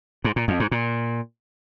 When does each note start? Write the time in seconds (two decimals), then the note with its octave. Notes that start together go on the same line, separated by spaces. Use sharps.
0.24 G#2
0.36 A#2
0.48 F2
0.60 G#2
0.71 A#2